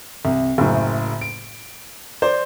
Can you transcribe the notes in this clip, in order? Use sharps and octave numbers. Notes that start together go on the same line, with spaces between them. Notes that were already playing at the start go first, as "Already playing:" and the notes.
C2
F#1 F#2 A2 C#3
D7
C5 D5